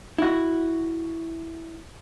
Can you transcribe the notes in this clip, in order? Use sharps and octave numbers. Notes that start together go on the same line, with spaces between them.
E4 F#4